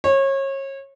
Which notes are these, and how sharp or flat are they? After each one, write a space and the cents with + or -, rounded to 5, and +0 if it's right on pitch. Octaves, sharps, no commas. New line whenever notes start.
C#5 -30